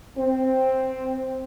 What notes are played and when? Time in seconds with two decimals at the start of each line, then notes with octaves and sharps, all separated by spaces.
0.18 C4